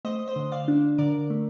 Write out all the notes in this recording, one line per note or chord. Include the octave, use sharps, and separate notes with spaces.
A3 C5 D#5
C5 D#5
D3
D5 F5
D4
D3 A#4 D5
A3